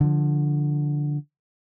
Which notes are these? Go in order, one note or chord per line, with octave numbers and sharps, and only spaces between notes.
D3 F3